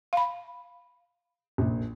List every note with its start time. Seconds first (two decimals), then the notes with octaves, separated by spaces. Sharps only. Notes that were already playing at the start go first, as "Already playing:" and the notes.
0.13 F5 B5
1.58 A#1 A#2